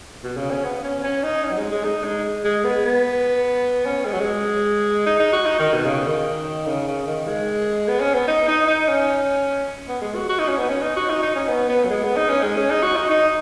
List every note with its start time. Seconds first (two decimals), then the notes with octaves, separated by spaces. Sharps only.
0.24 B2
0.37 C#3
0.51 C#4
0.64 B3
0.84 C#4
1.04 C#4
1.24 D#4
1.44 C#4
1.51 F#3
1.57 G#3
1.71 G#3
1.84 D#4
2.04 G#3
2.44 G#3
2.64 B3
2.85 B3
3.86 C#4
4.05 G#3
4.13 F#3
4.20 G#3
5.06 D#4
5.20 D#4
5.33 F#4
5.46 D#4
5.60 D#3
5.73 B2
5.86 C#3
6.06 D#3
6.67 C#3
6.87 C#3
7.07 D#3
7.28 G#3
7.88 B3
8.01 C#4
8.14 B3
8.28 D#4
8.48 D#4
8.68 D#4
8.88 C#4
9.88 B3
10.01 G#3
10.15 F#4
10.29 F#4
10.39 D#4
10.48 C#4
10.58 B3
10.70 C#4
10.82 D#4
10.96 F#4
11.10 D#4
11.23 D#4
11.35 C#4
11.49 B3
11.69 B3
11.85 F#3
11.90 G#3
12.04 B3
12.17 D#4
12.30 C#4
12.43 G#3
12.56 C#4
12.70 D#4
12.83 F#4
12.96 D#4
13.10 D#4